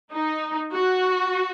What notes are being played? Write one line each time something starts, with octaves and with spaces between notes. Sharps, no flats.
D#4
F#4